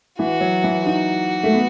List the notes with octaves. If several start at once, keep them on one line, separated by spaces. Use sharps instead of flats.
E3 F#4
F#3
E3
D#4 F#4
A3
B3